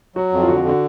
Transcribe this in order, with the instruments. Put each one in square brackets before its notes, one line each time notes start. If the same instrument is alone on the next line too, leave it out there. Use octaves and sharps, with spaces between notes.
[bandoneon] F#3 [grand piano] F#4
[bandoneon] F2
[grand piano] F4
[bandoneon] D3 [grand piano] F#4
[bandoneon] D3 [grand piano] F#4